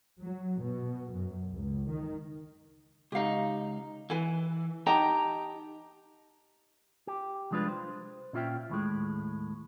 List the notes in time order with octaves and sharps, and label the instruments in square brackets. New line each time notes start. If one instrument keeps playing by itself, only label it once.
[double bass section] F#3
B2
F#2
C#2
D#3
[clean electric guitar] C#2 D#4 [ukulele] G4 F5
[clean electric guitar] E3 [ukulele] B4 G#5
[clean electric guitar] D#4 G4 A#5 [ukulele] D#5 G5 A5
[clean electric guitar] G4
C2 F3 G#3 D4 F4 B4
C5
A#2 C#4 F4 D5 E5 G5
D#2 A2 G#3